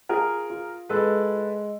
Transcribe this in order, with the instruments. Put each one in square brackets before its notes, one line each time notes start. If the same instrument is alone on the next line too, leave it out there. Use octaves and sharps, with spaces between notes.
[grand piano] F4 [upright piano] G#4 A#4
[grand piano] F4
[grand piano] G#3 [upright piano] A4 B4